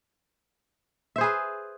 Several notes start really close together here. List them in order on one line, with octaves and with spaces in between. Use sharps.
E5 C5 G#4 B4